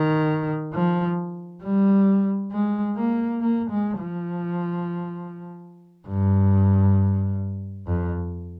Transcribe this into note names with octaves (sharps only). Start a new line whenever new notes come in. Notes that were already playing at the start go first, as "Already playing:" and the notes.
Already playing: D#3
F3
G3
G#3
A#3
A#3
G#3
F3
G2
F2